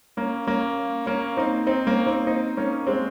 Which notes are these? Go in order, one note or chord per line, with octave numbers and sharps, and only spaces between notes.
A#3 C#4
A#3 C#4
A#3 C#4
C4 D#4
C4 D#4
A#3 C#4
C4 D#4
C4 D#4
A#3 C#4
G#3 C4